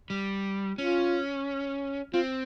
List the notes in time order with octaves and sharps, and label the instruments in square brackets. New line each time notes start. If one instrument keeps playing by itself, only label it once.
[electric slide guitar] G3
[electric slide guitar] C#4 [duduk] F4
[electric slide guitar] C4 [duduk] F4